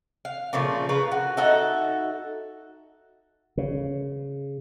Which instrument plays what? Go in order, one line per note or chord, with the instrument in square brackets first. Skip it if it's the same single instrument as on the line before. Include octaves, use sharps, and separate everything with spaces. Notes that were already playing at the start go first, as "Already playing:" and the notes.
[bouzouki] F5
A#2 C#3 F3 A3
C#3 F4 B4 A#5
F#4
D#4 F#4 A4 E5
[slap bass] C#3